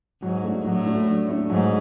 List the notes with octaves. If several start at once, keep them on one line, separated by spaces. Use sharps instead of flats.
G#2 F#3
A3 D4
A2 F#3
A3 D4
F#3
A3 D4
G#2 F#3